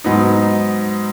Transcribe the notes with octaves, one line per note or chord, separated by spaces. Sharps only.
G#2 F#3 B3 D#4